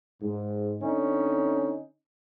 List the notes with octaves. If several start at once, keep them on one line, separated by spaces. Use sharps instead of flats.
G#2
D3 C4 C#4 D#4